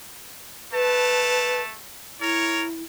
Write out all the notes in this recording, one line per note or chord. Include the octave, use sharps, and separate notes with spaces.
A3 B4 A5
E4 A#4 C#5